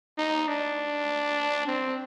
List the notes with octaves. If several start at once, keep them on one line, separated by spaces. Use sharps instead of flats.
D#4
D4
C4